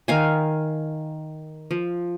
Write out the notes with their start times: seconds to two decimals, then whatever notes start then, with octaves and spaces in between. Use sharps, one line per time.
0.08 D#3 F5 G#5
1.71 F3